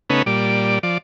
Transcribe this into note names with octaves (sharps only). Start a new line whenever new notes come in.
C#3 A3 B3 C#4 D#4 B4
A#2 G3 D5
F3 D5